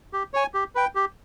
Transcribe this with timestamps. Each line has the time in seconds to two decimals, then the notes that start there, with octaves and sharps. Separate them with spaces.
0.13 G4
0.34 C#5 G#5
0.54 G4
0.75 B4 G5
0.95 G4